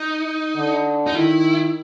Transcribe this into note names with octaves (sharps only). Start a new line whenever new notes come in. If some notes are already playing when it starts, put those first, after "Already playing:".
Already playing: D#4
D3
D#4
D#3 E4